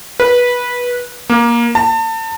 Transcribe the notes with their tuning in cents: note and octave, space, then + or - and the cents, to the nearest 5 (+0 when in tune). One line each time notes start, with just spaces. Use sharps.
B4 -15
A#3 +15
A5 +35